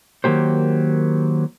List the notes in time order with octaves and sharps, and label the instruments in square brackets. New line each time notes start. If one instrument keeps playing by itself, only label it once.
[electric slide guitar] D#3 F#3 A#3 G4 C5